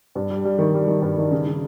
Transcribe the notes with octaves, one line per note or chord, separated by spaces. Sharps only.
G2
G3
G3
D#3
G3
D#3
G2
D#3
C#3
C#3